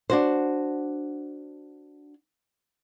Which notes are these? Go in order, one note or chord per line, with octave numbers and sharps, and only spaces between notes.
D4 F#4 C5